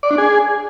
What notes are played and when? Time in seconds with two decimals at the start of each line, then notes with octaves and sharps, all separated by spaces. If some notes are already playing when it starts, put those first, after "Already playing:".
0.03 D5
0.11 D4
0.18 G#4